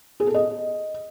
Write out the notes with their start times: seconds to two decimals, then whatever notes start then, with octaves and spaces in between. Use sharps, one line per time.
0.20 G#4
0.27 A4
0.34 D#5